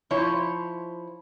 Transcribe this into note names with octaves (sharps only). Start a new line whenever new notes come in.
F3 E4 C5 C#5